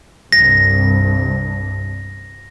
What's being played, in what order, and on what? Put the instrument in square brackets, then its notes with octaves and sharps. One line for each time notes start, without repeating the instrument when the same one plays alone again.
[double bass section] C2 G2 C3 [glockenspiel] A#6